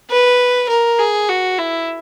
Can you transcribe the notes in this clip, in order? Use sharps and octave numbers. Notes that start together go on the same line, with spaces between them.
B4
A#4
G#4
F#4
E4